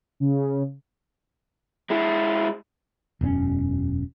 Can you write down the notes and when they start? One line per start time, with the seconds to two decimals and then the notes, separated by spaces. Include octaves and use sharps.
0.20 C#3
1.90 G#3 E4
3.21 E1 F#2 A3 C#4